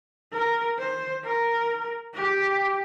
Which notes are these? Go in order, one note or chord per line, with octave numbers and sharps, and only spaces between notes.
A#4
C5
A#4
G4